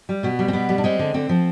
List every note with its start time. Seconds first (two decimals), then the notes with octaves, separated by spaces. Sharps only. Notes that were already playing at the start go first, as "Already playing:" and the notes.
0.09 G3
0.23 B2 B3
0.39 G3
0.48 C4
0.53 B2 B3
0.69 G3
0.78 D4
0.84 G#3 C4
0.99 D3
1.14 D3 C4
1.29 F3